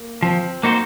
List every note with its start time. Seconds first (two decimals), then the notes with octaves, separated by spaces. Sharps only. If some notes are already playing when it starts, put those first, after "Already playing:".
Already playing: A#3
0.22 F3 C4
0.63 A#3 D#4 F#4 C5